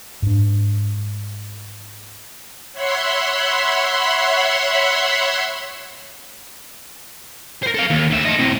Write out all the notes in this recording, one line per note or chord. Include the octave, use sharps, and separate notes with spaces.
G#2 D4
C#5 E5 F#5 B5 C6
A#4 C5
A4 F5
D#2
D2 E5
A4 D#5
A2 C3